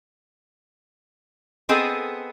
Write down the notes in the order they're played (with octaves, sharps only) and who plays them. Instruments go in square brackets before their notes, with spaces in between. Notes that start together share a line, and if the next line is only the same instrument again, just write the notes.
[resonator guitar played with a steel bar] B3 C4 G#4 A4 D#5